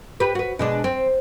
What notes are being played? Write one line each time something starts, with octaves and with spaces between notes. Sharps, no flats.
G4 B4
F#4 B4
B2 G#3 D4
C4